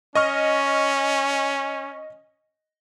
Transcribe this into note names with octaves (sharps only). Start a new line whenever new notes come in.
C#4 D#5 C#6 F6